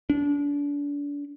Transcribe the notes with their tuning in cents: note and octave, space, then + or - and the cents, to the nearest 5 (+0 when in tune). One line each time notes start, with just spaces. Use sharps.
D4 -35